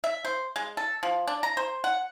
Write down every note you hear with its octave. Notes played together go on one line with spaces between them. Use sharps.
E5
C5
G#3
A4
F3
D4
A#5
C5
F#5